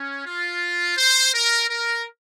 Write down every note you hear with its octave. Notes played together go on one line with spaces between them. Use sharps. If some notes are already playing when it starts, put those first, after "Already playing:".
Already playing: C#4
F4
C5
A#4
A#4